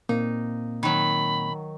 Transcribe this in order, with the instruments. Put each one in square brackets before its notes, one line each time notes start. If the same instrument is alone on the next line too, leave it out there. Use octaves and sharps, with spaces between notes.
[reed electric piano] A#2 A#3 C4 [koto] D#4
[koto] D#3 F#3 [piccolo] B5